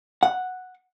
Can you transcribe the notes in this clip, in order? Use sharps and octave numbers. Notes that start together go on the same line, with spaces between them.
F#5